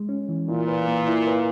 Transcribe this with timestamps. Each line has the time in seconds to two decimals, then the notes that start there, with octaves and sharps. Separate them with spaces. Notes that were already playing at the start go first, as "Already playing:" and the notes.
Already playing: G#3
0.09 C#4
0.29 E3
0.48 A#2 E4
0.68 B4
0.88 A#3
1.08 E4
1.27 B4